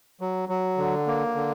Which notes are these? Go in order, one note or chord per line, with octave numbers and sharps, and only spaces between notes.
F#3
F#3
D3
A#3
D3